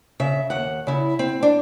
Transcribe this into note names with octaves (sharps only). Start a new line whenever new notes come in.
C#3 E5
D#2 F#5
C#3 E4
C4
D4